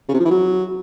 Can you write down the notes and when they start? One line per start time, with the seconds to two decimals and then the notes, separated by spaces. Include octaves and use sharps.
0.09 C#3
0.14 C3
0.20 F3
0.25 E3
0.31 F#3